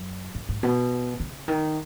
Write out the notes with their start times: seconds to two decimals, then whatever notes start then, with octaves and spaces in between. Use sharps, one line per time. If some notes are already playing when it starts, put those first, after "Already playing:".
Already playing: F#2
0.35 G#2
0.49 G#2
0.63 B2
1.20 C#3
1.48 D#3